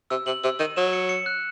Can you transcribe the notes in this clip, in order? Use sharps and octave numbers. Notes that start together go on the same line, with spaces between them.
C3 E6
C3 F#7
C3 E6
D#3 D#7
F#3 E7
C#7
C#7
F#6